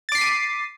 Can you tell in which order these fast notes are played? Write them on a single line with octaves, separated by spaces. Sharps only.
A6 D6 C7 B6 D#7